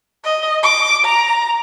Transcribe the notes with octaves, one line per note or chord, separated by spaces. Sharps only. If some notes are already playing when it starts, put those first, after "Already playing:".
D#5
D6
A#5